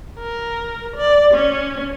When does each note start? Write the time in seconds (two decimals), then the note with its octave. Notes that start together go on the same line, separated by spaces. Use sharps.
0.19 A#4
0.97 D5
1.34 C#4